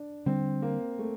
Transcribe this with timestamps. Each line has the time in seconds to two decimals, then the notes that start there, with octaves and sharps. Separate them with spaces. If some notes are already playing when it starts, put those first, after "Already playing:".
Already playing: D4
0.26 D3 G3 C4 D4
0.62 A#3
0.99 A3